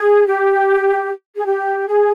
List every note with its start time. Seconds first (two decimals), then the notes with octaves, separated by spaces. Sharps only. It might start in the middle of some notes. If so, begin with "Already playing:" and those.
Already playing: G#4
0.26 G4
1.36 G#4
1.46 G4
1.87 G#4